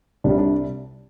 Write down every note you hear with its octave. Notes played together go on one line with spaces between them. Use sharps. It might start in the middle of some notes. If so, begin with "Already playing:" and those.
C2 C3 G3 D4
D4